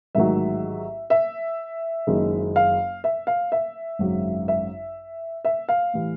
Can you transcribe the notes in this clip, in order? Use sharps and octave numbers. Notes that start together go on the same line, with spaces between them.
A1 G#2 D#3 F#3 E5
E5
F#1 F#2 D#3 G#3
F5
E5
F5
E5
G#1 F#2 C#3 F#3
E5
E5
F5
A2 E3 G3